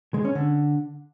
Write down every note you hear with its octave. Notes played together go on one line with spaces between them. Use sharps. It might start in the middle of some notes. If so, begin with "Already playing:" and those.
G#3
C#4
D3